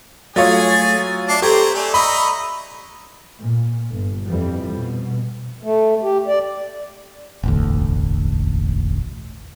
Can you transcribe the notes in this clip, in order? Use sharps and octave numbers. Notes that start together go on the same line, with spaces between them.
F#3 A3 F4 G#4 C#5 G#5 D#6 A6
D4 E5 A5 D6 C7
C4 G4 A4 A#5 C#6 G#6
A3 D5 G#5
D#5 E5 A#5 B5 C#6
A#2
G1
F2 E3 G3
B2
A3
G4
D5
E1 A1 D2